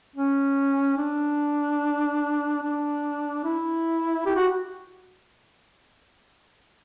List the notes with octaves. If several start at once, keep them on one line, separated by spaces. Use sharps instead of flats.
C#4
D4
D4
E4
G4
F#4